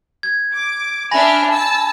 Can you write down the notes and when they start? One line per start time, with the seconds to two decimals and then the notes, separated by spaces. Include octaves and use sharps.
0.23 G#6
0.55 D6
1.11 D4 E5 G#5 B5 F6 A#6
1.50 A5 E6